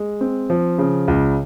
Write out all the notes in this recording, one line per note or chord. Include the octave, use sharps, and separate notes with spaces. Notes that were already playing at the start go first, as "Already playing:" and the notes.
Already playing: G#3
C4
F3
C#3
C#2